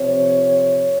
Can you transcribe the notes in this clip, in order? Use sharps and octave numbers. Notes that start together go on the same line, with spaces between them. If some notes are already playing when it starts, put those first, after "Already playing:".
Already playing: C3 F3 C4 C#5